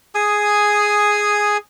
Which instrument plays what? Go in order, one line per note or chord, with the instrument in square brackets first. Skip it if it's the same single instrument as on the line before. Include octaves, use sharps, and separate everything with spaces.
[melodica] G#4 G#5 D#6